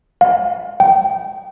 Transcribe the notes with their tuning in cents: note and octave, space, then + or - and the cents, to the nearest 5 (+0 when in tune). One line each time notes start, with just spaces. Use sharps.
F5 +30
G5 -25